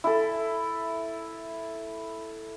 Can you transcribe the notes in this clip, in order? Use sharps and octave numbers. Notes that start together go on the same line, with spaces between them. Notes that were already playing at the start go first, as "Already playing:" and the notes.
E4 A4